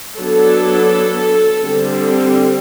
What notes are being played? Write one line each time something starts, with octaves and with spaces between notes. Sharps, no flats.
F#3 B3 D4 A4
D3 G3 C4